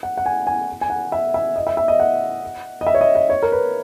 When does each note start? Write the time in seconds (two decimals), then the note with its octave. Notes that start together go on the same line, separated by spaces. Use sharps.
0.03 F#5
0.17 F#5
0.26 G#5
0.47 G#5
0.81 G#5
0.90 F#5
1.12 E5
1.34 E5
1.56 D#5
1.67 E5
1.77 E5
1.88 D#5
2.00 F#5
2.81 D#5
2.87 E5
2.94 C#5
3.01 D#5
3.15 D#5
3.30 C#5
3.42 A#4
3.52 B4